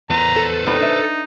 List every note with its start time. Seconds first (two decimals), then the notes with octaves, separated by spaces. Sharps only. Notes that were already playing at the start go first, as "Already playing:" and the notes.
0.10 E2 B4 C5 A#5
0.36 A4
0.66 E2 C3 D#4 B5
0.80 D4 E5